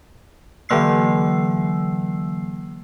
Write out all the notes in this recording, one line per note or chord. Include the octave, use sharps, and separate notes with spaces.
D3 E3 F#3 A#3 E6 C7